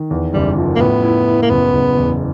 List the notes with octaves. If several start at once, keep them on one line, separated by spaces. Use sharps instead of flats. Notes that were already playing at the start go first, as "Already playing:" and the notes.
Already playing: D#3
E2
F#1 G3
F3
A#3
A2 B3
E4
E4
A#3
F#1 B3
F#1
E2